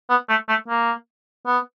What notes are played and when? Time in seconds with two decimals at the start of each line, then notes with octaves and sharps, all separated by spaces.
0.10 B3
0.29 A3
0.49 A3
0.68 A#3
1.46 B3